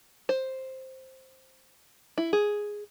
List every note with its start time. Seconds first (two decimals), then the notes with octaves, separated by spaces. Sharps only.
0.29 C5
2.18 E4
2.33 G#4